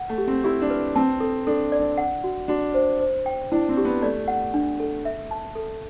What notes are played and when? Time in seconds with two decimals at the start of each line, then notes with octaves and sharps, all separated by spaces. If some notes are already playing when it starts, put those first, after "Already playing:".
Already playing: F#5
0.09 A3
0.18 G4
0.27 C4
0.44 E4 G4
0.62 D4
0.70 B4
0.96 C4 A5
1.20 A4
1.47 D4 A4
1.72 D5
1.80 D4
1.98 F#5
2.24 F#4
2.48 D4 F#4
2.74 C5
3.00 C5
3.26 G5
3.52 D4 E4
3.69 C4
3.77 G4
3.85 B3
4.02 A3 D5
4.28 F#5
4.54 D4
4.80 A4
5.05 E5
5.31 A5
5.55 A4